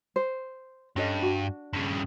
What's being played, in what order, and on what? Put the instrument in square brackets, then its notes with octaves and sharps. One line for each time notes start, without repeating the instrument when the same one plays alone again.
[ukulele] C5
[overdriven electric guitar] G2 [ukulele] C#4 A4 D#5
[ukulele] D4 F#4
[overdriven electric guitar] G2 C#3